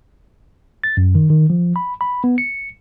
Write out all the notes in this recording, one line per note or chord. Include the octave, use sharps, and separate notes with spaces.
A6
F#2
D#3
D#3
F3
B5
B5
B3
C#7